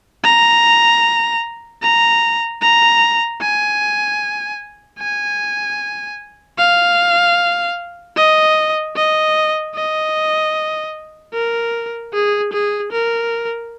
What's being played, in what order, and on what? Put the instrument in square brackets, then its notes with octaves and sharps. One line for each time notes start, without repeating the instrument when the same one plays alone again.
[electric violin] A#5
A#5
A#5
G#5
G#5
F5
D#5
D#5
D#5
A#4
G#4
G#4
A#4